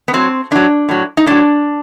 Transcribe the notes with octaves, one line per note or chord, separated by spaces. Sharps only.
B3
A2 F#3 C4
A2 F#3 D4
A2 F#3
D#4
A2 F#3 D4